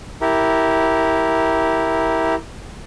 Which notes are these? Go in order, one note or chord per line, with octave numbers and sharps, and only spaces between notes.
E4 G4 A#4